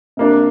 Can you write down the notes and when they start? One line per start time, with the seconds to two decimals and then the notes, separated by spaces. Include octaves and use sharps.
0.17 C3 A#3 D4